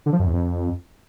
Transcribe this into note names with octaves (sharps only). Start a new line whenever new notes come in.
D3
F3
F#2
E2
F2